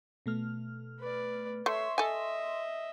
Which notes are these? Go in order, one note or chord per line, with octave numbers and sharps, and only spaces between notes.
B2 A3 F6
B4 D5
A3 C#5 E5 C6
A4 D#5 E5 G#5